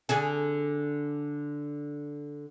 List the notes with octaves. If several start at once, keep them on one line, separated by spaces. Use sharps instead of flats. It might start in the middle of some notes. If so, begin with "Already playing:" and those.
D3 D4 G#4